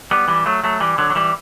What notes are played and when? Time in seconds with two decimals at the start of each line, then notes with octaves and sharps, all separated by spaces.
0.11 G3 B3
0.28 E3 G3
0.46 F#3 A3
0.64 F#3 A3
0.80 E3 G3
0.98 D3 F#3
1.10 F#3
1.15 E3 G3